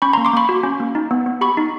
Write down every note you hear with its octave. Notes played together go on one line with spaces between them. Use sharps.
C#4 B5 C#6
A#5 C6
A#3
C6 D6
A#3 B5 C#6
F#4
C#4
A#3
D#4
B3
B3
G4 B5 C#6
D#4